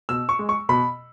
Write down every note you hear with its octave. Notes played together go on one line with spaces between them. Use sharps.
B2 E6
C#6
G#3
C#6
B2 B5